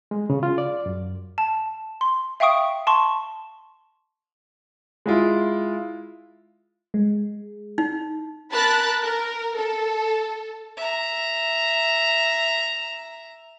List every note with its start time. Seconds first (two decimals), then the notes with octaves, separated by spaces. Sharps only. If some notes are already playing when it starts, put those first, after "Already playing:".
0.11 G#3
0.30 C#3
0.43 F4
0.58 D5
0.86 F#2
1.38 A5
2.01 C6
2.40 E5 F5 G5 C#6 D#6 D7
2.87 A5 C6 C#6
5.06 G#3 E4 F4
6.94 G#3
7.78 D#4
8.52 A#4 A5 B5 F#6 A6
9.02 A#4
9.57 A4
10.77 E5 A#5